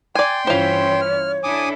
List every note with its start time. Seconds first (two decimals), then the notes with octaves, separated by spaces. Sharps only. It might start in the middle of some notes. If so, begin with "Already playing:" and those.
0.15 D5 G5 G#5 C6
0.47 G2 E3 C#4 F4 C5 C#5
1.01 F6
1.44 D4 E4 A4 G#5 D6 D#6